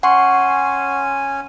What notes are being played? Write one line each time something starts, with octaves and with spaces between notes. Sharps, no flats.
C#4 F#5 G#5 C6 C#6